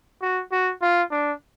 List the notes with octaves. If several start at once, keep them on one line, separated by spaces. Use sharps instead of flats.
F#4
F#4
F4
D4